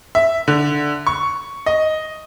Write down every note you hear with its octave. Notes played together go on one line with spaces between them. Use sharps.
E5
D3
C#6
D#5